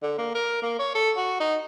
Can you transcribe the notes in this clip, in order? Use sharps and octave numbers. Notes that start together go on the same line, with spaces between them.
D3
A#3
A#4
A#3
C#5
A4
F#4
D#4